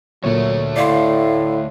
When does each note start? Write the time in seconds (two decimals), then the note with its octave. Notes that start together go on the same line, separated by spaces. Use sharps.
0.24 D2 A#2 F#3 A3 C#5
0.77 A2 D5 F5 C6